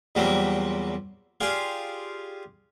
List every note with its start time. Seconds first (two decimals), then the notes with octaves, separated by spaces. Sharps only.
0.15 E2 A#2 F#3 G3 A#3 C4
1.41 F4 G4 G#4 D5 F5